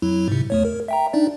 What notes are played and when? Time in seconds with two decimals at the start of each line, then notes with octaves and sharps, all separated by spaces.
0.02 F2 F#3 E4
0.28 G#2 C3
0.50 E2 A3 C#5
0.65 A#4
0.88 E5 G5 A#5
1.13 D4 D#4 D5